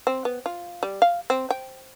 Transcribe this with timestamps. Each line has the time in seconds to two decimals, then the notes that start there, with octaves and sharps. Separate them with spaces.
0.07 C4
0.25 B3
0.46 F4
0.83 G3
1.02 F5
1.30 C4
1.50 G5